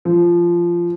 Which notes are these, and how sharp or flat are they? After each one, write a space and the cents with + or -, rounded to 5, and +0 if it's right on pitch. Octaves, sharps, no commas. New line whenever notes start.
F3 -15